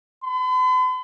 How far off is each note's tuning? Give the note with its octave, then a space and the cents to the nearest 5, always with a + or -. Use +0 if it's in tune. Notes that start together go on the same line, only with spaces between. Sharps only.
B5 +45